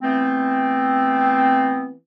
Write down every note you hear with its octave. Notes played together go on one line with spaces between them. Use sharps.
E3 A3 B3 C4